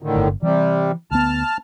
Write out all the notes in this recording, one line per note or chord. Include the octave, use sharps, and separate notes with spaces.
A2 D3 D#3
G1
C3 E3 G3
D2 B3 A5 F6